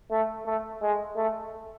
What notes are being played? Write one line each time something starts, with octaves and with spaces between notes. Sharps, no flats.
A3
A3
G#3
A3